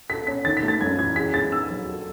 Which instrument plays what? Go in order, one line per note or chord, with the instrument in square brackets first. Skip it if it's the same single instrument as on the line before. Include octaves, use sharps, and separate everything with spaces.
[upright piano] A4 [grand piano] B6
[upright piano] C#4 [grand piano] B6
[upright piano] D#3 [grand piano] A6
[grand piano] B6
[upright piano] A3
[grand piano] A6
[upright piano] F#2 [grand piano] G#6
[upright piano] E3 [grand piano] G#6
[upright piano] G#4 [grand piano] B6
[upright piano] G#3 [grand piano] A6
[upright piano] D#4 [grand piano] E6
[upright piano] F#3
A4